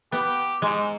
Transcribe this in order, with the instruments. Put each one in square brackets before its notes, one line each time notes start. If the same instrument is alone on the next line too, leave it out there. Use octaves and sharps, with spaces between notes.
[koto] B3 [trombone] G4
[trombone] G#2 [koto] G#3